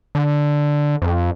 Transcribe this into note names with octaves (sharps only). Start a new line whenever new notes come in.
D3
F2